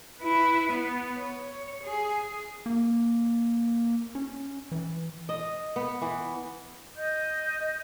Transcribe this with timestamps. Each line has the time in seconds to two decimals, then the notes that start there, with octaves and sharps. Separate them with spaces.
0.22 E4 B4
0.71 B3
1.17 C#5
1.84 G#4
2.66 A#3
4.15 C#4
4.72 E3
5.29 D#5
5.76 B3
6.02 E3
6.96 D#5 G6